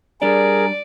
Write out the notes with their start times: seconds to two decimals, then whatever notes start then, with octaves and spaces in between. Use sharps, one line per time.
0.22 G3 D4 G#4 A#4 D5